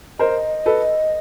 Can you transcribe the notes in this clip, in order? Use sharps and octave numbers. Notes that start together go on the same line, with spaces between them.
A#4 C5 D#5
A4 B4